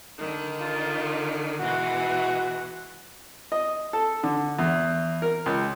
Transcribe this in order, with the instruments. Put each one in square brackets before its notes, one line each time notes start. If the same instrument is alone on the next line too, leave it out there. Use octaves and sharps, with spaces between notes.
[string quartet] D3 D#3
[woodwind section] F4
[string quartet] B2 E3 G#3 [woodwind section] F#4
[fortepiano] D#5
A4
D3
E2
A#4
C#2